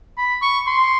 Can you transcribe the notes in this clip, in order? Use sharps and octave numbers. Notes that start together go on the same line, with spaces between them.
B5
C#6
C6